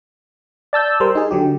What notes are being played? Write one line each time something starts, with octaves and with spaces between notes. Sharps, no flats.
D5 A5 E6 G6
G3 A#4 C5
D#4 G#4
D3 F#3 G4